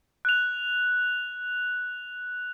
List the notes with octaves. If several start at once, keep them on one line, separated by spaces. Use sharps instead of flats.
F#6 F7